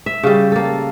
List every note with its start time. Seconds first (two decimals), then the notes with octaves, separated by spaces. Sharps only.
0.06 E5
0.23 C#3 G3
0.52 A#3 A4